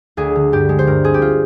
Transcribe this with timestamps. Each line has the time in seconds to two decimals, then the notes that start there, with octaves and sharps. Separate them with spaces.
0.17 D2 G#4
0.36 D3
0.52 G2 G4
0.69 G#3
0.79 C5
0.87 G2 A#4
1.04 C4 G#4
1.14 G4
1.22 F4